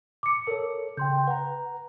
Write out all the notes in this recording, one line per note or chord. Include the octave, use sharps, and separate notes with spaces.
D6 C#7
A4 A#4 C#5
C#3 G5 C6 G6
B4 F#5 A#5